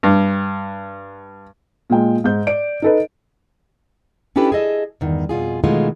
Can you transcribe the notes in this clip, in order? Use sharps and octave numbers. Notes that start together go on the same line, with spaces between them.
G2
A#2 G#3 G5
G#2 G6
D5 D7
D#4 A4 B4
C#4 D4 E4 G4 A4 B4
G#4 A4 D#5 E5
E2 G2 D#3
F2 B2 F4 G#4
B2 D#3 E3 G#3 A3 F4